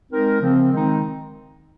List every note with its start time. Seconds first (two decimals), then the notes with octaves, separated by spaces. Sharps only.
0.11 G#3 C4 D#4 A#4
0.41 C#3 F3 C4
0.71 D#3 G#3 C4 D#4